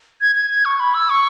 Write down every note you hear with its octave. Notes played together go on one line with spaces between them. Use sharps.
G#6
G#6
G#6
C#6
B5
E6
C#6